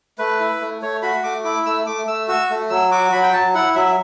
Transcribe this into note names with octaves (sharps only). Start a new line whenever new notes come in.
A3 B4
E4
A3
A3 C#5
F#4 B5
A3 D6
E4 D6
A3 E6
A3 D6
A3 E6
F#4 E6
A3
F#3 E6
F#4 D6
F#3 B5
G5
F#3 A5
E4 F#5
F#3 E5